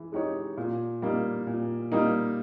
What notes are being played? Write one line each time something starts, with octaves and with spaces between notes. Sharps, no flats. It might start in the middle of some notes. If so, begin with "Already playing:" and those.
Already playing: E3 G#3
G#3 D#4 G4 C#5
A#2
G3 A#3 D#4
A#2
G3 A#3 D#4